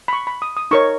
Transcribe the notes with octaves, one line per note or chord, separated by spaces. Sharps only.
B5
C#6
B5
D#6
D#6
D#4 A#4 C#5 C#6